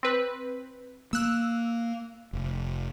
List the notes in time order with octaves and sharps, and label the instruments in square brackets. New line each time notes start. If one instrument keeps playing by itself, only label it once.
[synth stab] C4 B4
[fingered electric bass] A#3 [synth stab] E6 F#6
[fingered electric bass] F1